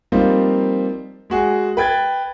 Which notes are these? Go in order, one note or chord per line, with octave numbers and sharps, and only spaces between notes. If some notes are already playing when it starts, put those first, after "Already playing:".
F3 G3 A#3 C4 D#4 F4
G#3 F#4 G#4
B4 G5 G#6 A6